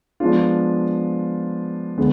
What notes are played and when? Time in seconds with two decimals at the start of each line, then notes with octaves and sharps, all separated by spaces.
0.20 F3 G#3 B3 D4 F4
1.97 D3 G#3 B3